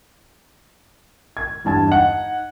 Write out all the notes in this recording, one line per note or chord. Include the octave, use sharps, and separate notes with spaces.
G#6
E2 G2 A5 G#6
D#4 F#5